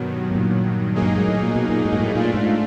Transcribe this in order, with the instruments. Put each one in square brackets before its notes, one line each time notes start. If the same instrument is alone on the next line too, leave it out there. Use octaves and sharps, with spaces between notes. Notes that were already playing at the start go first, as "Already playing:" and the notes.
Already playing: [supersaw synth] G2 D#3 F#3 [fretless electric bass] B2
[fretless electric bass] A2
A#2
[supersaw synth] F#3 A#3 D#4 G#4
[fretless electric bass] G2
G#2
A2
A#2
B2
A#2
A2
G#2
A2
[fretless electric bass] A#2 [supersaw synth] A3 D4 F4
[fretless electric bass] G#2